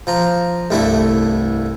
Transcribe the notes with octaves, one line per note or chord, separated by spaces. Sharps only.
F3 A#5
C2 G2 A3 E4